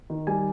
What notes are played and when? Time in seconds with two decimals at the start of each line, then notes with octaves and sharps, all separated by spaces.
0.10 D#3
0.27 G3 G#5